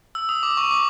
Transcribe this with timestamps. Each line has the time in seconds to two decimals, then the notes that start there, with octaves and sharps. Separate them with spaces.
0.15 E6
0.29 D#6
0.43 D6
0.57 C#6
0.71 D6